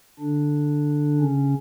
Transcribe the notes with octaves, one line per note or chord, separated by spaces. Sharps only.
D3 D4
C#3 C#4